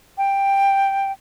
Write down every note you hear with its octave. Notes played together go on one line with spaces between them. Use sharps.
G5